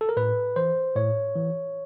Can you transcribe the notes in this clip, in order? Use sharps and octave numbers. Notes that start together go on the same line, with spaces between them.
A4
A#4
A2 B4
E3 C5
A2 C#5
E3